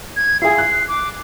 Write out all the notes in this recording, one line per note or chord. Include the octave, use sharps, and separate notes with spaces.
G#6
E4 F4 G#4 C7
F#6
D6